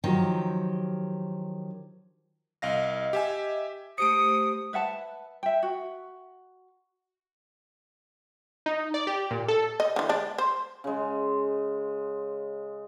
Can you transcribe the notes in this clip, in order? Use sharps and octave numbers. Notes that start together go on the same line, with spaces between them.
D#3 F3 F#3 G4
C2 D#5 F5 A#6
G4 E5 G#5
A3 G4 C5 D#6 C#7 D7
B4 E5 F#5 A5
E5 G5
F#4
D#4
D5
G4
A#2
A4
D#5
D3 E3
G#3 D4
C5
C#3 G#3